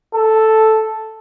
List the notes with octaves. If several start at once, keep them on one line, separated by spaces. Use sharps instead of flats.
A4